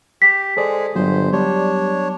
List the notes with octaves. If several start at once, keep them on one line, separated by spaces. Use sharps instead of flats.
G4 B6
G#3 G#4 A4 C5 D5
G1 F#3 B3 C5
G3 D4 C#5